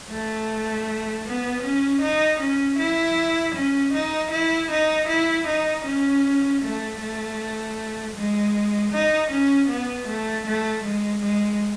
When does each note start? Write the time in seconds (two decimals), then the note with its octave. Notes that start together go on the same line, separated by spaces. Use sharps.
0.10 A3
1.26 B3
1.63 C#4
2.02 D#4
2.40 C#4
2.79 E4
3.55 C#4
3.94 D#4
4.32 E4
4.71 D#4
5.09 E4
5.47 D#4
5.85 C#4
6.63 A3
7.01 A3
8.16 G#3
8.93 D#4
9.31 C#4
9.69 B3
10.08 A3
10.46 A3
10.84 G#3
11.23 G#3